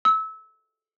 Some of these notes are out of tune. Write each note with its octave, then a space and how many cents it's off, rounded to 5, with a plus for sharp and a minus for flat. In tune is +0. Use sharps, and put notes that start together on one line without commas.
E6 -25